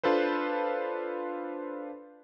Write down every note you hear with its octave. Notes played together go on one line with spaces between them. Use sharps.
D4 F4 A4 B4 C5